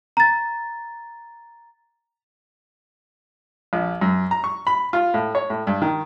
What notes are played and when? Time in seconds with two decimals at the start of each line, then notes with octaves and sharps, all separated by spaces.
0.17 A#5 A6
3.73 A#1
4.01 F#2
4.31 A#5
4.44 C#6
4.67 B5
4.93 F4
5.14 A2
5.35 C#5
5.50 A2
5.67 G2
5.82 D#3